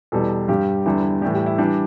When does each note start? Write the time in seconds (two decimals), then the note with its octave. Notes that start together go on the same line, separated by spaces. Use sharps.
0.12 E2 B2 G3 A4
0.49 G2 G3 G4
0.86 E2 D3 G3 E4
1.22 A2 E3 G3 G4
1.34 G4
1.46 E4
1.58 E3 G3 D4